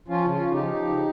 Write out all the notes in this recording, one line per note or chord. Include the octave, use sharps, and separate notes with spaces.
F3 C#4 F4
C#3
C#4 F4
C#3
D#4 G4
F3
F3
C#3